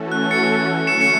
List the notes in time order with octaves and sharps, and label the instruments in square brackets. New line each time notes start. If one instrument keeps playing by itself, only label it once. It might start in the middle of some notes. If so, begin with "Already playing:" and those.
Already playing: [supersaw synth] E3 A3 C#4 F#4 A4
[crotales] F#6
A6 C#7
[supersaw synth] D3 F#3 A3 C#4 [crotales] C#7 E7
[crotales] C#7 E7